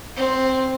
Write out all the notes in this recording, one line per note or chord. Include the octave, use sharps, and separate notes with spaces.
C4